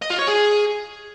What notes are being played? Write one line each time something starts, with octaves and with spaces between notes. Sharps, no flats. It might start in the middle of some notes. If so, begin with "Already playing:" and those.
D#5
F4
C#5
G#4